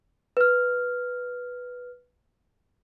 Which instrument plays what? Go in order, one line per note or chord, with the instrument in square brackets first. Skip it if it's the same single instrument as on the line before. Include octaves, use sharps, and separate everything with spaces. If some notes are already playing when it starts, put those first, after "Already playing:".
[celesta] B4 F6